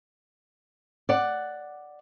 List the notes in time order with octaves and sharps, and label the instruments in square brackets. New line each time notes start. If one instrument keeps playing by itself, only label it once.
[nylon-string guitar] D5 F#5